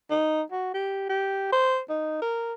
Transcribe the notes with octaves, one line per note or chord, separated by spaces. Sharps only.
D#4
F#4
G4
G4
C5
D#4
A#4